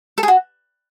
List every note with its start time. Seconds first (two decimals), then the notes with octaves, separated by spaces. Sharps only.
0.18 A4
0.23 G#4
0.28 F#4